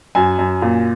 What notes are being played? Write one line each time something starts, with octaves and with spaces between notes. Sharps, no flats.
F#2 G#5
F#2
A#2